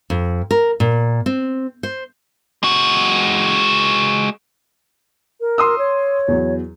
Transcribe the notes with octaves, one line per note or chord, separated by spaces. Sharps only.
F2
A#4
A#2
C4
C5
G#3 F#4
A#4
C6 D#6 E6
C#5
E2 F#3